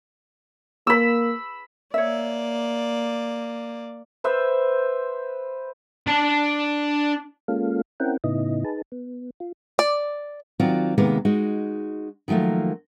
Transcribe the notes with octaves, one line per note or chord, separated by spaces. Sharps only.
A#3 B5 E6
A#3 C#5 D5 E5
B4 C5 E5
D4 A5
G#3 A#3 C#4 F4 A4 F5
C4 C#4 E4 A#4 F#5 G5
A2 C#3 B3 D#4 E4 D#5
D#4 G#4 B4 A5
B3
F4
D5
D#3 F#3 C4 F4 F#4 D5
C3 D#3 G#3 A#3 B3
G#3 D#4 F#4
D#3 F3 F#3 A3 A#3